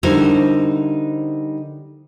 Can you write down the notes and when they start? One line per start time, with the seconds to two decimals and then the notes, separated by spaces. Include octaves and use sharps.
0.03 D3 G3 D#4 E4 A#4 C5